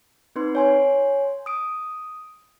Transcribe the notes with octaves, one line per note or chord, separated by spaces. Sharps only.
C4 D#4 B4 C6
C#5 G#5 C6
D#6 D7